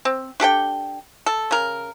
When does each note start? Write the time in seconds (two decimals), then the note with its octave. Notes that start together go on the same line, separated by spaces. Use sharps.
0.05 C4
0.40 D4 G4 A4 G5
1.26 A4
1.51 C#3 A#4